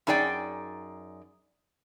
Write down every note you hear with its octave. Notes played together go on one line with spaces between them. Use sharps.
F#2 D#4 G#4 D5 G5